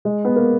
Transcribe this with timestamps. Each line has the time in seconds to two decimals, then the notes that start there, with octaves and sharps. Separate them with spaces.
0.05 G#3
0.25 B3
0.36 A#3